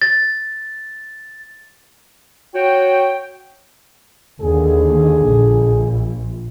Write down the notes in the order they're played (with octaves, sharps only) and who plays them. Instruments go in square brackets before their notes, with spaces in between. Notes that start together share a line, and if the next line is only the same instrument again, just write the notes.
[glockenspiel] A6
[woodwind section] F#4 C#5 G5
[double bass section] D#2 [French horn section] D3 G#4
[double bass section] A#1